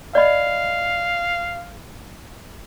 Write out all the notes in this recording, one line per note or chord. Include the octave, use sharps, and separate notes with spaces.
D5 D#5 F5 B5